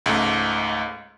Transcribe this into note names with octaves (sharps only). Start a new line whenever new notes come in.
C#2 G#2 A3